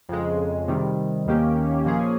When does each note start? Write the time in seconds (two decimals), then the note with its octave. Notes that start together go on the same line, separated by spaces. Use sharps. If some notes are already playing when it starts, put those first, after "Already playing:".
0.09 F2 C#3 G#3
0.68 C3 D#3 G3
1.26 D#2 D#3 A#3 C#4 G4
1.85 A#2 F3 A#3 C#4 G#4